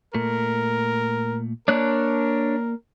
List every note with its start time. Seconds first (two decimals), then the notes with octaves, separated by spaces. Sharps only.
0.14 A#2 A3 A#4
1.68 A#3 D4 A#4 C#5 D5 F#6